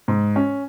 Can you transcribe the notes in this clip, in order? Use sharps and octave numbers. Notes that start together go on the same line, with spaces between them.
G#2
C#4